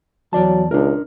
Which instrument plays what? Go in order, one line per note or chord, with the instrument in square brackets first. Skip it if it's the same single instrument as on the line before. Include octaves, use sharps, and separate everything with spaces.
[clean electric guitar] E2 D5 A5 [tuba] F#3
[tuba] C#2 [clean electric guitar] D4 A#4